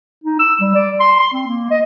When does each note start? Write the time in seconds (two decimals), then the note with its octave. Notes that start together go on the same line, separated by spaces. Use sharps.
0.24 D#4
0.39 E6
0.61 G3
0.75 D5
1.00 C6
1.20 C6
1.33 C4
1.47 A#3
1.71 D#5